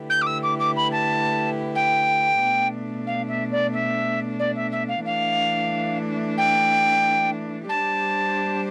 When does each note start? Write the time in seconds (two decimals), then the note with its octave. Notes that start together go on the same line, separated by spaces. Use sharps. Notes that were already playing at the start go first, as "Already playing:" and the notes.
Already playing: D3 A3 E4 G4 B4
0.10 G6
0.22 D6
0.27 E6
0.43 D6
0.60 D6
0.76 B5
0.92 A5
1.75 G5
2.41 B2 A3 D4
3.07 F5
3.29 E5
3.52 D5
3.73 E5
4.39 D5
4.56 E5
4.72 E5
4.88 F5
5.05 E3 A3 D4 F5
6.38 G5
7.69 G3 D4 G4 C5 A5